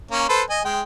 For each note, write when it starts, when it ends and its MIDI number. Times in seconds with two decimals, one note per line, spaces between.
0.11 0.28 58
0.11 0.28 61
0.29 0.42 69
0.29 0.42 71
0.29 0.42 72
0.50 0.61 75
0.50 0.61 80
0.64 0.81 56
0.64 0.81 79